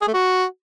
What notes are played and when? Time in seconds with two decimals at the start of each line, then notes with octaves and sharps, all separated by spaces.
0.02 G#4
0.08 A3
0.14 F#4